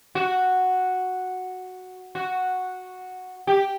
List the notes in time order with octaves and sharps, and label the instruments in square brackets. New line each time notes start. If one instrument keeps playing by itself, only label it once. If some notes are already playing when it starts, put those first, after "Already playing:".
[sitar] F#4
F#4
G4